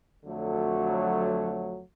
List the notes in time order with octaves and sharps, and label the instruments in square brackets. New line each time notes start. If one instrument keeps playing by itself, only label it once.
[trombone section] F2 D3 F#3 A3